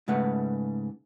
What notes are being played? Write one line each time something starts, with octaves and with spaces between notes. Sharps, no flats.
G#2 C#3 A3 B4 F#5